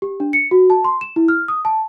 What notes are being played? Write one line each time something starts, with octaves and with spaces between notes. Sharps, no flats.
G4
D4
C#7
F#4
A5
C6
E7
E4
F6
D#6
A5